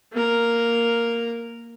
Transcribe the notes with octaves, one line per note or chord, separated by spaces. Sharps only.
A#3 A#4